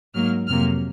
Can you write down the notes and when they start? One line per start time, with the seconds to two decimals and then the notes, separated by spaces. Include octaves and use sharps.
0.14 G#2 F#3 A#3 F6
0.47 F2 C3 F#3 A#3 F6